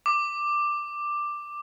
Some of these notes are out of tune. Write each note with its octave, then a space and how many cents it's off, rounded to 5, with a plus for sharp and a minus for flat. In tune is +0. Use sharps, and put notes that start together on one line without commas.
D6 +10